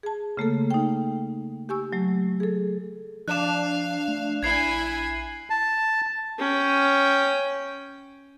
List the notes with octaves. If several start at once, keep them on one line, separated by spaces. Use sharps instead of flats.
G#4 A5
C#3 A3 A#3 A4
D#4 G5
G4 G#5 C#6 E6
F#3 A3
G#4 A4
F3 D4 F5 F#6 E7
A3
A#1 E4 G#5 G#6 C7
A5
C#4 G5